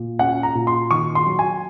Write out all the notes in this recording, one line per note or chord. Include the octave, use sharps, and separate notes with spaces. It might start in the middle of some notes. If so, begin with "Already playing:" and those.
Already playing: A#2
C#4 F#5
A#5
A#2
C6
D#3 C#6
C6
F#3
G#5